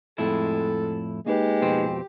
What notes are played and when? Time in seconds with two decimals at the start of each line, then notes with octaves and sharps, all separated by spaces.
0.18 F2 A2 G#3 E4 A4
1.27 G#3 A#3 D#4 G4 B4
1.61 F2 B2 C4